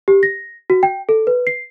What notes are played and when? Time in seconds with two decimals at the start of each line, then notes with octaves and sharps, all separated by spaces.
0.08 G4
0.23 A#6
0.70 F#4
0.83 G5
1.09 A4
1.27 B4
1.47 C7